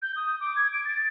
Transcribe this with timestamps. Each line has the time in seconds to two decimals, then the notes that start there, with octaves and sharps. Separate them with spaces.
0.02 G6
0.16 D#6
0.40 D6
0.56 G#6
0.73 D7
0.85 A6